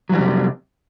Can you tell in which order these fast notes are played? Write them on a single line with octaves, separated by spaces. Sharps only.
F#3 E3 G3 F2 C3